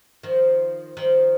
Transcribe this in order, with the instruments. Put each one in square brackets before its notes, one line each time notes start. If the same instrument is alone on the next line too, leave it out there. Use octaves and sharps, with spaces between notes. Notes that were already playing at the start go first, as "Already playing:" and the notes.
[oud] D#3 F3
D#3 F3